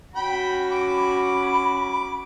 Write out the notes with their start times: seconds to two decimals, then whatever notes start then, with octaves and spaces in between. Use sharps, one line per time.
0.16 C#4 F#4 G5 B5
0.72 B5 D6